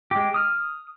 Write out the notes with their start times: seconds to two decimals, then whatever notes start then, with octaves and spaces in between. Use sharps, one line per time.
0.11 G#3 G4
0.34 D#6 F6